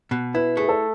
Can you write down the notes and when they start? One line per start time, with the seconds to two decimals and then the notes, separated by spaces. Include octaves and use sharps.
0.11 B2
0.34 E4 B4
0.57 A3 G#4
0.69 A4